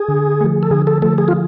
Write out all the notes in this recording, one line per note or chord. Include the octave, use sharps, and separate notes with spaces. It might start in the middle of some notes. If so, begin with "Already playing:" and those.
Already playing: G#4
D3
F3 A3
A4
D3 G#4
A4
F3 A3 A4
G#4
F4